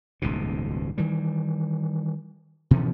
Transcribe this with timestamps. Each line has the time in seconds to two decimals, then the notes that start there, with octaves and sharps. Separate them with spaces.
0.22 D#1 C#2 G#2 B2
0.98 D#3 E3 G3
2.71 B2 E3 F3 C#4